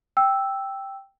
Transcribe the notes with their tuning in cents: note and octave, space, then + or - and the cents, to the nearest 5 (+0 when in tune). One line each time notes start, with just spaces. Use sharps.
G5 +0 E6 +0